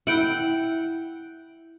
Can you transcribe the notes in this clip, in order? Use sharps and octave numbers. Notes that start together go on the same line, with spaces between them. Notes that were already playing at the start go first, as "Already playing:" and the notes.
E4 F#5 G5